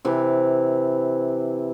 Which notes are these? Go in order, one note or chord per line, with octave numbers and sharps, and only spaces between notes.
C3 E3